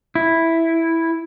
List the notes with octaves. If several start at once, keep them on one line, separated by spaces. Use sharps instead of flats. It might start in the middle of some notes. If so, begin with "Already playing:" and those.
E4